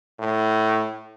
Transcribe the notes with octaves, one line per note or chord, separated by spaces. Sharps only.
A2